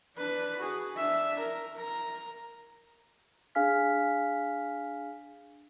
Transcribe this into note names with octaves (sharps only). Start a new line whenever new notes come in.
D4 B4
F#4 G#4
D4 E5
A#4
A#4 A#5
D4 G#4 F5 G#5 F6 B6